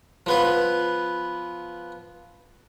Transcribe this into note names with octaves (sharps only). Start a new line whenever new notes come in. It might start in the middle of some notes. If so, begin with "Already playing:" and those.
F3 B3 B4